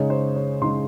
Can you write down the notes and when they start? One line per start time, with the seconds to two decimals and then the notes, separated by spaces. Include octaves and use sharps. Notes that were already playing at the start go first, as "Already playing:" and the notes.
Already playing: C#3 G#3 D#4 C#5
0.10 C5
0.36 C#5
0.62 C#3 G#3 D#4 C6